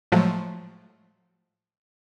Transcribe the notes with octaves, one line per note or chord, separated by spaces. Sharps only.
A2 F3 F#3 G#3 A3